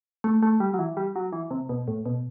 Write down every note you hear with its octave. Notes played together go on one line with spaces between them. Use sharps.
A3
A3
G3
F#3
E3
G3
F#3
E3
C3
B2
A2
B2